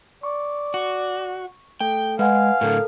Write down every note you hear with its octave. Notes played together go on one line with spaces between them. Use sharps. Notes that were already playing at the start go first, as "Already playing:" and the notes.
D5 C#6
F#4
A3 A4 G5
G#3 B4 F5 F#5 G#5
A2 D3 A4 A#4